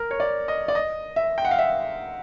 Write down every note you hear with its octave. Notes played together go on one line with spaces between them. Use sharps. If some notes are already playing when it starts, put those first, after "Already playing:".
Already playing: A#4
C#5
D5
D#5
D5
D#5
E5
G5
F#5
F5
E5